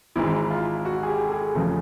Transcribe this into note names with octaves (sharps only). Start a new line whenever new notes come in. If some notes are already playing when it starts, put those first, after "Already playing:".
G#1 G#2 E3 G#3 E4
F4
F#4
G#4
G4
A4
G#4
E2 C#3 F3 A3